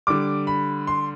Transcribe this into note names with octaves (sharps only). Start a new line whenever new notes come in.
D3 G3 D6
B5
C6